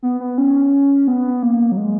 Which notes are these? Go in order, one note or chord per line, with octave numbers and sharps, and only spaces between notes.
B3
B3
C#4
B3
A#3
F#3
G#3